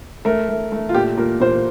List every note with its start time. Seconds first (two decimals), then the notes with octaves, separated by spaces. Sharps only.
0.25 A3 A#4
0.49 A3
0.72 A3
0.89 F4
0.95 A#2 G4
1.17 A#2 A#4
1.40 A#2 C5